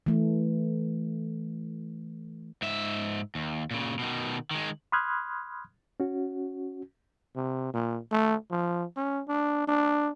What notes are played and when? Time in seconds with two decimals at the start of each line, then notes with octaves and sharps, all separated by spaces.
0.06 E3 A3
2.62 G#2 E5
3.35 D#2
3.71 A#2 C#3
3.99 B2 D#3
4.51 D#3 G#3
4.92 B5 C6 D#6 F6 F#6 G#6
6.00 C#4 F#4
7.36 C3
7.74 A#2
8.12 A3
8.51 F3
8.97 C#4
9.28 D4
9.68 D4